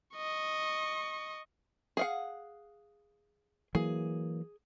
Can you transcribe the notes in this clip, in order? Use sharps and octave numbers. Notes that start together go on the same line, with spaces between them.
D#5 C#6
G#4 F5 F#5
E3 F#3 A#3 G#4